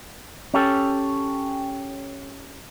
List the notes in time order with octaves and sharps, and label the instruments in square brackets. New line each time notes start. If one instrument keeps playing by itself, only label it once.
[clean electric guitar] C#4 G4 A4